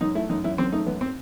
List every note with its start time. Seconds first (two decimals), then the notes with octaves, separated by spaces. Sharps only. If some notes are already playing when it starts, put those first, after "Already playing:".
0.01 F#2 D#4
0.15 A3 E4
0.30 F#2 D#4
0.44 F#2 E4
0.58 F#2 C4
0.72 A3 D#4
0.86 F#2 B3
1.01 C4